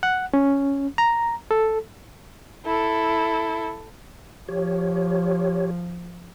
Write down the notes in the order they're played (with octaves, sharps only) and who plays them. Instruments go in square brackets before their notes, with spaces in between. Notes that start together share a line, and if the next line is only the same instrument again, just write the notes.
[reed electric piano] F#5
C#4
A#5
A4
[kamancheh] E4 A4
[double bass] F3 [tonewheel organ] G4 C#5